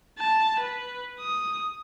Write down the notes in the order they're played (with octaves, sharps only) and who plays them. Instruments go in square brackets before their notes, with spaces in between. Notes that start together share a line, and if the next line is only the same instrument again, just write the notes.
[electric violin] A5
B4
D#6